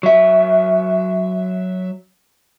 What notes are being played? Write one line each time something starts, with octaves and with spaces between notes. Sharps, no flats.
F#3 E5